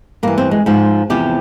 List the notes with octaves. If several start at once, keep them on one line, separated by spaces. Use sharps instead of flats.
G2 E3 A#3
C4
G#3
G#2 F3
E2 C3 F3 G4